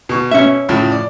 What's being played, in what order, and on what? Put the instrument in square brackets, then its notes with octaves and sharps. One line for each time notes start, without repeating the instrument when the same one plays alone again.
[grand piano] B2 C#6
[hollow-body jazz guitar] C#4 E5
[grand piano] A2 C#3 F3
D5